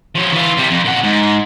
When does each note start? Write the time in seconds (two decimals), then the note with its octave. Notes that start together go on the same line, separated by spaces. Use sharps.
0.15 F3 C#5
0.32 E3 F4
0.57 C3 G3
0.70 F2
0.85 A#2 F#5
1.03 G#2